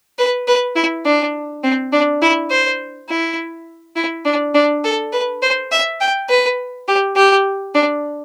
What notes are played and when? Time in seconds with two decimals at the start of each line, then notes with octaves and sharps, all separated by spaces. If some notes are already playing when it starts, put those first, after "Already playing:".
0.19 B4
0.48 B4
0.76 E4
1.06 D4
1.64 C4
1.92 D4
2.22 E4
2.51 C5
3.09 E4
3.96 E4
4.25 D4
4.55 D4
4.84 A4
5.13 B4
5.42 C5
5.72 E5
6.00 G5
6.29 B4
6.88 G4
7.16 G4
7.75 D4